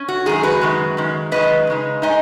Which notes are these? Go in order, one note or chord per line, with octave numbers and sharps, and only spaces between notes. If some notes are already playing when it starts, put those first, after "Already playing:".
Already playing: C#4
F#4
F#2 D#3 G#3 G#4
F#4 B4
F#2 D#3 G#3
F#2 D#3 G#3
F#2 D#3 G#3 B4 D#5
C#3 G#3 D#4
G#3 D#4 D#5 G#5